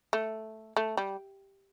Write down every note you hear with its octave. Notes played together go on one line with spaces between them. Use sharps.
A3
A3
G3